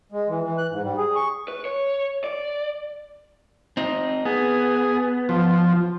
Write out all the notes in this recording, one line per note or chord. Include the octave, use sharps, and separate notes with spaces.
G#3
E3
E3
F#6
G#2
G3
G#4
C#6
B4
C#5
D5
C4 D#4
B3 G#4
F3